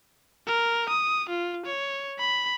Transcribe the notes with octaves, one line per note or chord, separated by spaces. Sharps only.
A#4
D#6
F4
C#5
B5